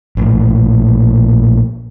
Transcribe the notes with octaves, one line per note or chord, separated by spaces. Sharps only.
A#1 A2